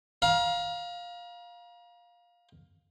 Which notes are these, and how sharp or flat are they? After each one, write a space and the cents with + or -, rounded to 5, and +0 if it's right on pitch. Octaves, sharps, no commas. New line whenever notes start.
F5 +10 A#5 +40